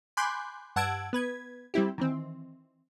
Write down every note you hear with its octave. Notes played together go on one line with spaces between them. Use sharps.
G#5 B5 C6 D6 F#6 G6
G2 F#5 A5 E6 G#6 D7
B3 B4 G#6
G3 C4 E4 G4
D#3 E3 C4